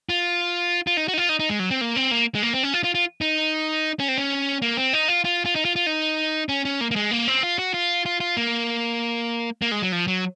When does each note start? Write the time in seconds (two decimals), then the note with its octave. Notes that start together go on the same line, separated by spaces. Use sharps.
0.09 F4
0.87 F4
0.97 D#4
1.08 F#4
1.14 D#4
1.18 F4
1.29 D#4
1.40 D#4
1.49 G#3
1.60 F#3
1.71 C4
1.81 A#3
1.96 C4
2.11 A#3
2.35 G#3
2.43 A#3
2.54 C4
2.63 C#4
2.74 F4
2.84 F4
2.95 F4
3.21 D#4
4.00 C#4
4.08 C4
4.18 C#4
4.62 A#3
4.77 C4
4.93 D#4
5.08 F4
5.25 F4
5.46 F4
5.56 D#4
5.65 F4
5.76 F4
5.86 D#4
6.49 C#4
6.65 C#4
6.81 A#3
6.91 A#3
6.96 G#3
7.11 A#3
7.27 C4
7.43 F4
7.59 F#4
7.74 F4
8.06 F4
8.20 F4
8.37 A#3
9.62 A#3
9.71 G#3
9.82 F#3
9.92 F3
10.07 F#3